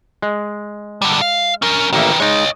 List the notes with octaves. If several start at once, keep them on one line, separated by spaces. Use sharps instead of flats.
G#3
D3 G3
F5
C#4 A#4
A1 D#3 A#3 B4 E5
G#3 D#4 C#5 D#5